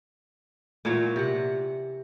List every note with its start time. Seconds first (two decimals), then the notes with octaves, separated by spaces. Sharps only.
0.85 A#2 E3 F#3 C#5
1.16 C3 F#5